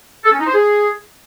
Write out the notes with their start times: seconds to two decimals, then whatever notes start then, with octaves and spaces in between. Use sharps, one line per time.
0.25 A4
0.32 C#4
0.39 D#4
0.47 C5
0.54 G#4